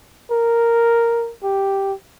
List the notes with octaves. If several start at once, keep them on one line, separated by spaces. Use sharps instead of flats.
A#4
G4